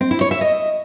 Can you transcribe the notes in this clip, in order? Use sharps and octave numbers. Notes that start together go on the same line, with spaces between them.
C4
E4
C#5
E5
D#5